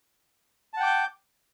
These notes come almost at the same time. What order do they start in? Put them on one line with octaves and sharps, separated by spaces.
A5 F#5 G5 D6 G6